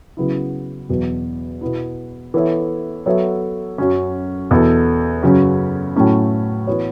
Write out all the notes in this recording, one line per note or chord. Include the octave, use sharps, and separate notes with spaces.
C#3 F#3 B3 E4
E2 B2 F#3
B2 B3 E4
E3 B3 A4 C#5 E5
F#3 B3 A4 C#5 E5
F#2 F#3 C#4
E2 B2 B3 E4 A4
F#2 C#3 F#3 C#4
A2 F#3 A3 C#4 E4
E3 B3 F#4 C#5